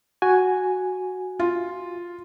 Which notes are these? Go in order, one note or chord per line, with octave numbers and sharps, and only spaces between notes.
F#4 G#5
F4